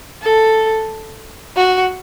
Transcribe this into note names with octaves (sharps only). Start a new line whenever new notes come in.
A4
F#4